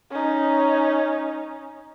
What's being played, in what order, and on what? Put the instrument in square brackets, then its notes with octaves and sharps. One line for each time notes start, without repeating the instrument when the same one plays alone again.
[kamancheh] C#4 D#4